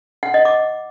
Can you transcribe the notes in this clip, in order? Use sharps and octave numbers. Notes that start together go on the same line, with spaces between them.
F#5
D#5
D6